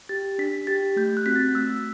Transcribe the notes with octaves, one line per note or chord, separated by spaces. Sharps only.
G4 A6
D4 B6
G4 A6
A3 G6
F#6
C4 F#4 B6
A6
A3 E6